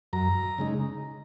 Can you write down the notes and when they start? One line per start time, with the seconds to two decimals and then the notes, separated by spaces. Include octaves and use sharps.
0.13 F#2 A#5
0.58 C#3 G#3 D#4